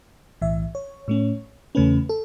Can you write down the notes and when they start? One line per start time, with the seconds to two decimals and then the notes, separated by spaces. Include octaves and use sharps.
0.41 B1 A2 E3 E5
0.75 C#5
1.08 A2 A3 C#4
1.75 E2 C#3 A3 C#4 B4
2.09 A4